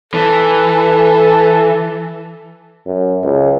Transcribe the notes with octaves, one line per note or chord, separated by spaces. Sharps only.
E3 A4
F#2
C#2